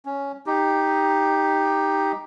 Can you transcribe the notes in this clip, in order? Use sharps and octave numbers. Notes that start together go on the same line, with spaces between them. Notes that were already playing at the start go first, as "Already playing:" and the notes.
C#4
D#4 G4